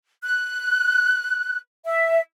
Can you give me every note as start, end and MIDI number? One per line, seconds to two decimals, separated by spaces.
0.23 1.57 90
1.85 2.20 76